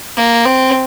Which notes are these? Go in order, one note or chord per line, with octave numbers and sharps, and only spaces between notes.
A#3
C4